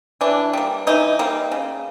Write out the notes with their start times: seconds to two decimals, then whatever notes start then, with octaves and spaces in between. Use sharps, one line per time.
0.21 E3 D4
0.53 G3 A#3
0.87 E3 D#4
1.19 G3 A#3
1.52 C#3